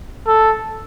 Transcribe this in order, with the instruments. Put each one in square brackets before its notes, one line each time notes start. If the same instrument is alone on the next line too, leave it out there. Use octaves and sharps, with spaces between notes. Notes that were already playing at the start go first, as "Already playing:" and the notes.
[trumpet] A4